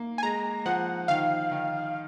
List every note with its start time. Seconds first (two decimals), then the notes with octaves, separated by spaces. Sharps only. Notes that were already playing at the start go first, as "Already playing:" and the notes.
Already playing: A#3
0.18 G#5
0.23 G#3 A#5
0.66 F3 F#5
1.08 D#3 F5
1.51 D#3